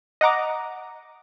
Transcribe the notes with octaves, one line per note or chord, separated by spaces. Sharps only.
D#5 F#5 A#5 D6